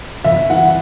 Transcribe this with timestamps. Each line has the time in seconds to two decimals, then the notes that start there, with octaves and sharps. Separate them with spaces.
0.24 G1 E5
0.50 E3 F#5